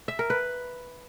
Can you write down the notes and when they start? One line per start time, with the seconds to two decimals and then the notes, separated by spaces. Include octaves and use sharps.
0.08 E5
0.19 A#4
0.30 B4